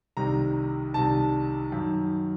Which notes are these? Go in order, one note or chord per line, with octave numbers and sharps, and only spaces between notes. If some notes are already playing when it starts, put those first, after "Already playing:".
C2 C3 D#3 A#5
C2 C3 D#3 A5
F#2 D#3